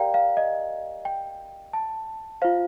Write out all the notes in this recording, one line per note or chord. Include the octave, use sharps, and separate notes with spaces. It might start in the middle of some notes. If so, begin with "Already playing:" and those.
Already playing: G4 A#4 D5 F5 G5 A#5
F5
D#5
G5
A5
F4 C5 F5